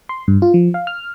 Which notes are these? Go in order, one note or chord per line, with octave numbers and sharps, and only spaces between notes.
C6
G2
F4
F3
F5
F6